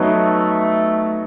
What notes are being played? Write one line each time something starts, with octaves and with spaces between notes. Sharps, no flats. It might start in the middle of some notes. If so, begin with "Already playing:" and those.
Already playing: F#3 A3 B3 D#4